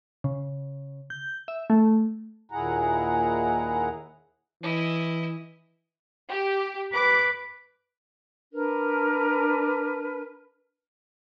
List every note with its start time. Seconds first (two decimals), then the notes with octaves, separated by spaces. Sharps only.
0.24 C#3
1.10 G6
1.48 E5
1.70 A3
2.52 D#2 A#2 E4 G#4 F#5 A#5
4.63 E3 E4 D#5
6.29 G4
6.93 B4 D6
8.52 D4 A#4 B4